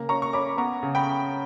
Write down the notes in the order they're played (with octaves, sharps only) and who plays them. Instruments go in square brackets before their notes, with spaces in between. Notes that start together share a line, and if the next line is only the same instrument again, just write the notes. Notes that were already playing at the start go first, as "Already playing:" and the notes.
Already playing: [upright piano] C#3 A#3
C#4 A#5 C#6
C#6
C#4 B5 D6
B3 A#5 C#6
C#3
G5 B5